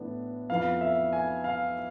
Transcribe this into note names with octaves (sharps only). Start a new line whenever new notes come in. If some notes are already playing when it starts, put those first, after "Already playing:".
Already playing: A2 E3 B3 D4
F2 E3 B3 F5
E5
G#5
F5